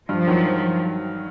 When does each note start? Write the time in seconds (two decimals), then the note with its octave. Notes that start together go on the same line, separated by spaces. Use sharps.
0.09 G2 F3
0.27 D#3 F#3